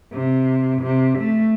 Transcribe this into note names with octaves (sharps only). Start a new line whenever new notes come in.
C3
C3
A3